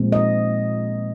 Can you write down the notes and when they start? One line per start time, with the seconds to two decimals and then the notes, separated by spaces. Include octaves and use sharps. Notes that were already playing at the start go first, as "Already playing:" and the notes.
Already playing: A#2 F3 G#3 C4
0.12 D#5